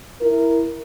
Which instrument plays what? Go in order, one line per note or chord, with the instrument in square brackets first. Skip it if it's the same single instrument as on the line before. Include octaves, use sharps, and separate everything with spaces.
[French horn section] E4 A#4